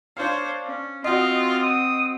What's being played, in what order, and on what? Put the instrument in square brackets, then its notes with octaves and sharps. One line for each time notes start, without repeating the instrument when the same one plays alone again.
[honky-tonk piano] D4 F5 [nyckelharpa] C5 C#5
[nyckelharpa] C#4
[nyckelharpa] C4 [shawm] F4 [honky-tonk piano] F#4 D#5
[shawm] D#6